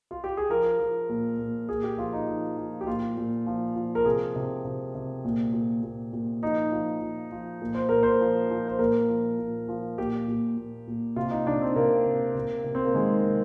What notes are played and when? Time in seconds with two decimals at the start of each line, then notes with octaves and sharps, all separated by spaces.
0.11 F4
0.24 G4
0.37 G#4
0.49 F3 A#4
0.79 F3
1.09 A#2
1.39 A#2
1.69 A#2 G#4
1.83 G4
1.98 F3 F4
2.13 D#4
2.27 F3
2.57 F3
2.81 G4
2.87 A#2 F4
3.17 A#2
3.47 F3
3.76 F3
3.95 A#4
4.05 C3 G#4
4.36 C3
4.65 C3
4.95 C3
5.25 A#2
5.53 A#2
5.83 A#2
6.13 A#2
6.42 F3 D#4
6.72 F3
7.01 F3
7.31 F3
7.62 A#2
7.75 C5
7.89 A#2 A#4
8.03 C5
8.20 F3
8.50 F3
8.68 C5
8.79 A#2 A#4
9.09 F3
9.39 A#2
9.68 F3
9.98 A#2 G4
10.28 A#2
10.57 A#2
10.88 A#2
11.16 C3 F4
11.31 D#4
11.46 C3 D4
11.61 C4
11.76 C3 A#3
12.05 C3
12.35 C3
12.64 C3
12.75 C4
12.85 A#3
12.94 D#3 G#3
13.23 C3